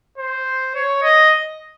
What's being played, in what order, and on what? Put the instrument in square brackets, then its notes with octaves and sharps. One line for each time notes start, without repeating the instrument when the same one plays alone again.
[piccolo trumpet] C5
C#5
D#5